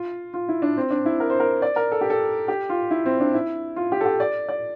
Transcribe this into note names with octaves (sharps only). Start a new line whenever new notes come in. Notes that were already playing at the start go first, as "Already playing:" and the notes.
Already playing: F4
F4
E4
D4
C4
D4
E4
A#4
C5
A#4
D5
A#4
A4
G4
A4
G4
F4
E4
C4
D4
E4
F4
G4
A4
G4
D5
D5